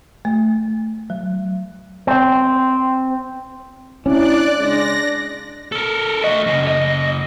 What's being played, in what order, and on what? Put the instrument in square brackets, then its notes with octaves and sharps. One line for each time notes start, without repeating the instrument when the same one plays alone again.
[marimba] A3
F#3
[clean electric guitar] C4
[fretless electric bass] C#4 [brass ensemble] D4 E4 [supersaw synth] D5 F#6
[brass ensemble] C#3 G#3 D4 [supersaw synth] A#6
[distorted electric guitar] A4 A#4
[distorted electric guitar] A3 F#4 [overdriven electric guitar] D#5
[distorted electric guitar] F#2 C#3
[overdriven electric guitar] D#5